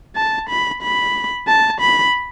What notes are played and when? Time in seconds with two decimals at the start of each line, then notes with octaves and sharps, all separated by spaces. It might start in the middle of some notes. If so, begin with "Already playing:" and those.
0.16 A5
0.49 B5
0.82 B5
1.47 A5
1.80 B5